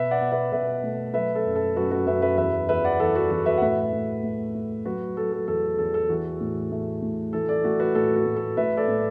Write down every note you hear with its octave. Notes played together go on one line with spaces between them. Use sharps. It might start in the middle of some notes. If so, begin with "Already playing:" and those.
Already playing: B2 B4 E5
D5 F#5
B2
B4 E5
B2 B4 E5
A3
F#3 B4 E5
A4
F#2
A4
F#2 F#4 B4
F#4 B4
F#2 B4 E5
B4 E5
E2 B4 E5
E2 B4 E5
D5 F#5
E3 A4 D5
F#4 B4
E2 F#4
B4 E5
F#5
A2 B4 E5
A3
A3
A3
F#3 F#4 B4
F#3 A4
A4
E2 A4
E2 A4
A4
E3 F#4
A2
A3
A2
E3 A4
A4 D5
A3 F#4
F#4 B4
A2 A4
F#4
A2
A4
A2 B4 E5
A4 D5
A2